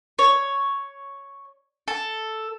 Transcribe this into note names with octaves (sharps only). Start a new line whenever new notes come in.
C#5
A4